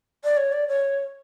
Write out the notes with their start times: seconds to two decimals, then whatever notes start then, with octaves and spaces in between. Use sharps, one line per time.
0.24 D5
0.37 C#5
0.53 D5
0.68 C#5